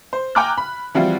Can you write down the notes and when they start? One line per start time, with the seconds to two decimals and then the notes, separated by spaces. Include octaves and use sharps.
0.13 C5
0.35 G5 G#5 A#5 D6 F6 F#6
0.57 B5
0.94 E3 F3 G3 C4 F4 F#4